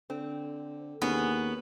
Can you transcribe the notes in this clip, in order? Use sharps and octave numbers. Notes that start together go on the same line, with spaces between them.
D3 C4
D#2 B3 C#4 G#4